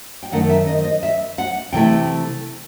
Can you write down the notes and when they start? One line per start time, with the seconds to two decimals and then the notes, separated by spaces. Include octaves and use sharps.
0.23 G5
0.32 F#2 D#3 A3 D#4 F#5
0.49 E5
0.67 D#5
0.77 C5
0.84 D#5
1.03 E5
1.38 F#5
1.73 C3 E3 A3 E4 G5